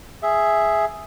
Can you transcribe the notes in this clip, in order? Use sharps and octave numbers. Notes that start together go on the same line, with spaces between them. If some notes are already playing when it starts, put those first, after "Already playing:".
G#4 E5